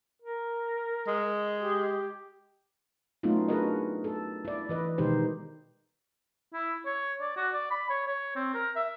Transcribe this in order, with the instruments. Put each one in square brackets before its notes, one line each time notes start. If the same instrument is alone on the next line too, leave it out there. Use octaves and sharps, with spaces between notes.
[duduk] A#4
[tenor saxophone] G#3
[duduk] G4
[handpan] F#3 A3 B3 C#4 D#4 F4
D4 F#4 G#4 A#4 B4 D#5
A4
E4 D5
E3 B4 D#5
B2 D#3 G#3 D#4 G4 C5
[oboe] E4
C#5
D5
F#4
D5
B5
C#5
C#5
C4
A#4
E5